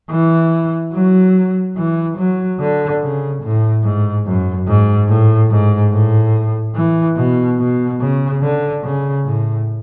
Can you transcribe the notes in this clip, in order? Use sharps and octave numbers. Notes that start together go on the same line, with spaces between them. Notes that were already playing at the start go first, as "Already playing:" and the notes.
E3
F#3
E3
F#3
D3
C#3
A2
G#2
F#2
G#2
A2
G#2
A2
E3
B2
B2
C#3
D3
C#3
A2